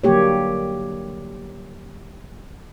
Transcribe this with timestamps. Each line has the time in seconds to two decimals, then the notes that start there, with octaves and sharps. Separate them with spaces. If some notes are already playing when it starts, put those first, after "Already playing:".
0.04 D3 F#3 G3 A#3 G4 C#5